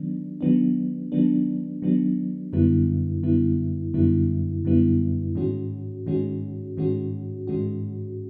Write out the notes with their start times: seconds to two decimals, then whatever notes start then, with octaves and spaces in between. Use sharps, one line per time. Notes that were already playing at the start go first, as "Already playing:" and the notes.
Already playing: D#3 F#3 B3 D4
0.41 D#3 F#3 B3 D4
1.12 D#3 F#3 B3 D4
1.82 D#3 F#3 B3 D4
2.53 F#2 D3 G3 B3 E4
3.23 F#2 D3 G3 B3 E4
3.94 F#2 D3 G3 B3 E4
4.65 F#2 D3 G3 B3 E4
5.35 G#2 D#3 G#3 C#4 F#4
6.06 G#2 D#3 G#3 C#4 F#4
6.77 G#2 D#3 G#3 C#4 F#4
7.47 G#2 D#3 G#3 C#4 F#4